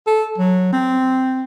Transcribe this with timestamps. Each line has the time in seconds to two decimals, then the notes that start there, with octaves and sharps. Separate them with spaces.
0.07 A4
0.38 F#3
0.72 C4